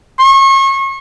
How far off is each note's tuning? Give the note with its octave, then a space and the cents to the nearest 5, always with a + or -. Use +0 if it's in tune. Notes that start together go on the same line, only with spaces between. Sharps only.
C#6 -35